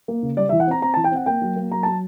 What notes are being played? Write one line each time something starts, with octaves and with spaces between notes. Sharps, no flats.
A#3
C#3
G3 D5
E5
E3
F#5
C4 A#5
C4 A#5
E3 A5
G5
C4 F#5
A#3 G5
F#3
A#3
F#3 A#5
F#3 A5